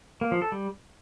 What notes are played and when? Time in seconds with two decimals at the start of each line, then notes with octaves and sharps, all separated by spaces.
0.21 A#3
0.32 F3
0.42 A4
0.52 G3